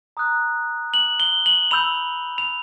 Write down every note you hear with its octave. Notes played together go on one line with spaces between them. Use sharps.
A#5 D#6 F#6
F#7
G7
F#7
B5 E6 G6 F7
F7